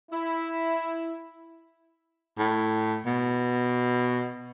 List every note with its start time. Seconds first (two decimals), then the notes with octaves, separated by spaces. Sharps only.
0.11 E4
2.38 A2
3.06 B2